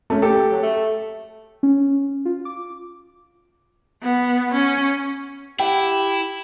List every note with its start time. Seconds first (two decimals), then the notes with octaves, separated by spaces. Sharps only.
0.10 A3 C#4
0.22 G4 A4
0.51 F#3
0.63 A3
1.63 C#4
2.25 F4
2.45 D6
4.03 B3
4.54 C#4
5.60 E4 G4 F#5 G5